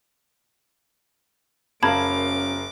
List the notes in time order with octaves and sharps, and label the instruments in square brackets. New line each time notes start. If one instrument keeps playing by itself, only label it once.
[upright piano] F#1 A#4 F5 [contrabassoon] F#2 [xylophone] A5 B5 G#6 [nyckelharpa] D6